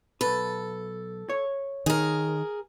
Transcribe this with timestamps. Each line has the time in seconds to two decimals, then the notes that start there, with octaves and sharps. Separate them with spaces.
0.21 B1 A4 B4
1.29 C#5
1.86 D#3 G#4 A#4